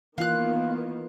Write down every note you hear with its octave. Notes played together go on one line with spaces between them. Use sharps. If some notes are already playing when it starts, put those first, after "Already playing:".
D#3 E3 A#3 B3 F4 F5 F#6